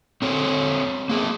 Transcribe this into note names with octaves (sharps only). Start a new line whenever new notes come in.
C4 A4 C#5
A#3 G#4